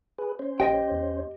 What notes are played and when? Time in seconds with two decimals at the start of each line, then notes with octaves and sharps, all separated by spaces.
0.18 G#4 B4
0.39 C#4 C5
0.60 A#1 G4 D#5 G5
0.91 E2